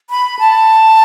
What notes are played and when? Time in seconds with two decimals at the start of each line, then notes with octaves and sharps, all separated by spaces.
0.10 B5
0.39 A5